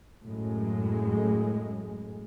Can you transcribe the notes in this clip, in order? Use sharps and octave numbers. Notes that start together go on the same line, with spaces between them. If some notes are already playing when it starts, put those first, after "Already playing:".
F#2 A2 G#3